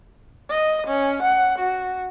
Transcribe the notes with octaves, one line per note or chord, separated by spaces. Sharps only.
D#5
C#4
F#5
F#4